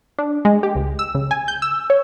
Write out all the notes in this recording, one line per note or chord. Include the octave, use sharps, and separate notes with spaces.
D4
G#3
G4
C#2
E6
C#3
G#5
G6
E6
C#5